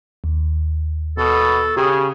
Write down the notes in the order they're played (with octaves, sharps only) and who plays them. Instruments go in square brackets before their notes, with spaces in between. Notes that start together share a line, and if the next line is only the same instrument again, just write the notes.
[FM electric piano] D#2
[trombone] B2 [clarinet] A4
[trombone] C#3 [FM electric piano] G4 [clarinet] G#4